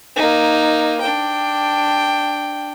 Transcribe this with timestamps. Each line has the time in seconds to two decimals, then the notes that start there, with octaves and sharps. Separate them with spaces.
0.16 A#3 D#4
1.01 D4 G5